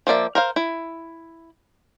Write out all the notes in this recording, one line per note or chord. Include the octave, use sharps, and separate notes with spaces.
F3 A#3 D5 E5
A#4 C5 F5
E4